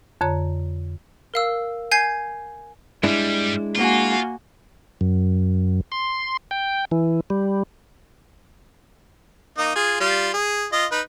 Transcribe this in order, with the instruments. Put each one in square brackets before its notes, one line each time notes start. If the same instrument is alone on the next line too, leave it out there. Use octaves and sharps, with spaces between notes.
[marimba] F2 D3 C#5 A#5
[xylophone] A#4 F5 E6
G#5 G6 G#6 C7
[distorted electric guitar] G2 G3 [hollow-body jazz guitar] G#3 D4 E4
[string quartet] A#3 F#4 G#5 [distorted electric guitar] F4
[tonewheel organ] F#2
C6
G5
E3
G3
[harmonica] A#3 D#4 D#6
F4 G#4
G3 F4 F5
G#4
F4 D#5
D#4 B4